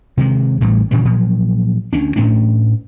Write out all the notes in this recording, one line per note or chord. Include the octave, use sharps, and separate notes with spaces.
C3 D#3 F#3 G#3
A1 A2 G3
A#2 C#3 E3 G3
A#2 F3 F#3
D2 G3 C#4 D4
A2 A3 C#4 D4